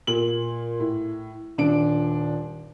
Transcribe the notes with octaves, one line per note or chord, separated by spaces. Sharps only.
A#2 F#7
A2
D#1 D4 D7